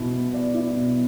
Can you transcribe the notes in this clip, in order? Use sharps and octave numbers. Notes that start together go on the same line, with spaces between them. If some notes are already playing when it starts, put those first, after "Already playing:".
Already playing: B2 E4
B3
D5
E4
B2